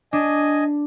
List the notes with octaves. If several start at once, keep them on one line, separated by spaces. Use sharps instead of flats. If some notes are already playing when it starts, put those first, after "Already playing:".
D4 D#5 G#5